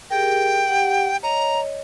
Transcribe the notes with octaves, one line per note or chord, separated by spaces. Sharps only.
G4 G#4 A#4 G5
G4 F#5
C#5 D#5 A#5